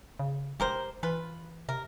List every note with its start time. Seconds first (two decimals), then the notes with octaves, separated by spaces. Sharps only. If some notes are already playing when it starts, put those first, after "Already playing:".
0.19 C#3
0.60 E1 G4 A#4 C5
1.03 E3 F4 B4
1.69 C3 A#4